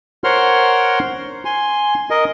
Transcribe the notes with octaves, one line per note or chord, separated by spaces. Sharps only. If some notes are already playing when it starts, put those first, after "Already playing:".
A#4 C5 C#5 F#5 C6 F6
G#5 C6
A#4 D#5